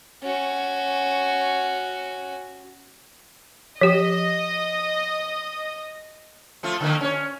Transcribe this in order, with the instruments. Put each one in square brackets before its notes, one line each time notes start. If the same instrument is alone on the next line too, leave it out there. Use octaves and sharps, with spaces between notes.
[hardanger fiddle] C#4 F#4
[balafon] F3 G4 [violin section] D#5
[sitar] F3 A3 F4
D3 D#3 A#3
C#4 C#5